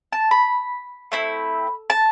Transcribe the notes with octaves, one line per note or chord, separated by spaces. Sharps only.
A5
B5
A3 C4 E4
A5